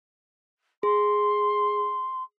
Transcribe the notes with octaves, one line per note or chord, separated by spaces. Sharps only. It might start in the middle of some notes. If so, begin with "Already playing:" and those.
G#4 C6